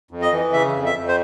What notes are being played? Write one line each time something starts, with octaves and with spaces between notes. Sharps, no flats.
F2
D#5
E3
C#3 E5
F2
E5
F2
C5